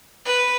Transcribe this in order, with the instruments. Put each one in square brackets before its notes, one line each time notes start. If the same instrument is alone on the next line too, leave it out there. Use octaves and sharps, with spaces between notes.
[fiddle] B4